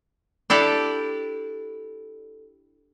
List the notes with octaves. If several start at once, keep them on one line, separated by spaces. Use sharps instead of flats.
D4 E4 G4 A4 D5